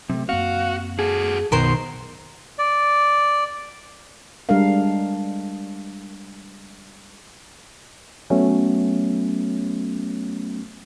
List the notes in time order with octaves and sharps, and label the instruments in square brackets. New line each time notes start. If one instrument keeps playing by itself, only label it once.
[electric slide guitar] C3 [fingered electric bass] F#3 A3
[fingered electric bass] F#2 A#3 C4 [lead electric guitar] F#4 [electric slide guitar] F5
[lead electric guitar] F#4 A4 [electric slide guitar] G#4
[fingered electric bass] B1 F#2 [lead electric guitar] B2 [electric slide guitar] D#3 [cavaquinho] A#4 C5 C6
[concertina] D5
[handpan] G3 G#3 D4 A4 A#4 F5
[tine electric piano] F#3 A3 B3 C#4